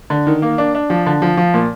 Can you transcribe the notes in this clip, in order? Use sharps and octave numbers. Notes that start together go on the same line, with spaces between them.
D3
D#3
A#3
D4
D4
F3
D3
F3
F3
A#2